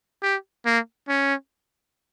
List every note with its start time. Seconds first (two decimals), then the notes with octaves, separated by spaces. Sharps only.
0.23 G4
0.66 A#3
1.09 C#4